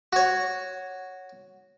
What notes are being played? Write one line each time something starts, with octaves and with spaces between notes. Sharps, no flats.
F#4 C#5